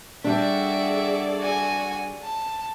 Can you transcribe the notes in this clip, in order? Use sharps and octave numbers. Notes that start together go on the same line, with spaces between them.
G3 D4 F#4 G#4 A4 D5 E5
F#4 G#5
A5